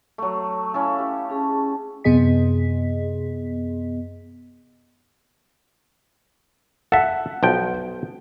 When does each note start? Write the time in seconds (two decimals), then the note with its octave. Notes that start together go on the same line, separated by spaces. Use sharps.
0.18 F#3 A3
0.74 C#4 E4 A4 F5
0.99 G4
1.29 C#4 G#4 A5
2.04 F#2 C3 B3 G#4 D#5 B6
6.92 A4 E5 F#5
7.43 B1 F3 G5